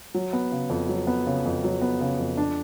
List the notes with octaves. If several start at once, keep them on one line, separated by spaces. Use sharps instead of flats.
F#3
B3
C#3
F2
F#3
B3
C#3
F2
F#3
B3
C#3
F2
D4